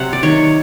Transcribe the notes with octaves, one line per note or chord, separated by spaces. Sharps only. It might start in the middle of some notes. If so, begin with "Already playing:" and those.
Already playing: C3 F#3 F#5
D5
D#3 C#5